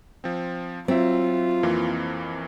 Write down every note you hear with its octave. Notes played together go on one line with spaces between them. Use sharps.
F3 C4
F#3 C4 F4 E5
F2 E3 A#3